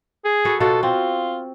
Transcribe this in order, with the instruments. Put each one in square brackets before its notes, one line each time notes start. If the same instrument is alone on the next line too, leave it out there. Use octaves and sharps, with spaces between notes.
[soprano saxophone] G#4
[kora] F#4 A4 B4
[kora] B2 F4 F#4 [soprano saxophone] A4
[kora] C4 [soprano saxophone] F4